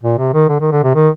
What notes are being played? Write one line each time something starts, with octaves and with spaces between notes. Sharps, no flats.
A#2
C3
D#3
D3
D#3
D3
C3
D#3